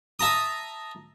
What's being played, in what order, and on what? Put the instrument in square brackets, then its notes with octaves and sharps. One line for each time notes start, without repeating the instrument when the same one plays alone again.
[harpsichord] E5 A5 A#5 D#6